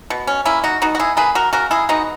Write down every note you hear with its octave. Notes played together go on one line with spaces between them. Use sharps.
B2
C#4
A#3 C#4 E4
D#4 F#4
B2 D#4 F#4
F#4
E4 G#4
A#3 G#4 B4
F#4 A#4
C#3 F#4 A#4
E4 G#4
G#3 B3 D#4 F#4